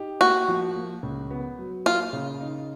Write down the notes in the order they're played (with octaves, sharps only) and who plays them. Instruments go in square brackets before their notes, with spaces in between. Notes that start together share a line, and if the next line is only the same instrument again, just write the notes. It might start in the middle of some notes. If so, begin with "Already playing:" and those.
Already playing: [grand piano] D#4 G4
[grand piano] A#3 [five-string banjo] F#4
[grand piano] F3
A#3
C#2
B3
F#3
[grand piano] A#3 [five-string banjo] F4
[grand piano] C#3
D#4